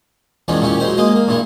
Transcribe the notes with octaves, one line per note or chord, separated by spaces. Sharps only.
E2 D#3 F3 G#3 C#4 D4
A#2 C#3 C#4 E4 G4
F#3 G#3 D#4 C5
G#3 A#3 D#5
A#3
G2 A#2 G#3 E4